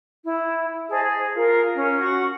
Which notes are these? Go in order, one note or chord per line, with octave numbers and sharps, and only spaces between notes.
E4
G#4 C5 D#5 A5
G#4
F4 A#4
C#4
F#4 F#5 C#6